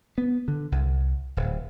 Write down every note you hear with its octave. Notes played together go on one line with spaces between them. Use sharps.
B3
D3
C2
D1